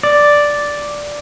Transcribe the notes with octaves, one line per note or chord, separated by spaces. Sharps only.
D5